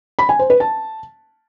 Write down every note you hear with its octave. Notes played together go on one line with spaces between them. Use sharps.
B5
G#5
C5
B4
A5